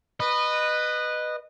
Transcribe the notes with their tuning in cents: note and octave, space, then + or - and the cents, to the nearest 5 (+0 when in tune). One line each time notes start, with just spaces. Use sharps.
B4 +0 D#5 -20